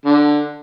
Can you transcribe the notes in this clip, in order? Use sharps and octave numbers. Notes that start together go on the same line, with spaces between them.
D3